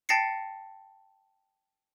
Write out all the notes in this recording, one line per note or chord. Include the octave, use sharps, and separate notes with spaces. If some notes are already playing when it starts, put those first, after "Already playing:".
G5 A5 A6 A#6 C7 C#7